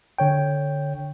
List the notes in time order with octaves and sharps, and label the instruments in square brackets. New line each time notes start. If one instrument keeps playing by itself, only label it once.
[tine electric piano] D3 C#5 G5